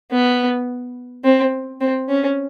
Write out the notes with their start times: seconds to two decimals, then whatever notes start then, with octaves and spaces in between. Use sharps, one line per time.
0.12 B3
1.24 C4
1.81 C4
2.09 C#4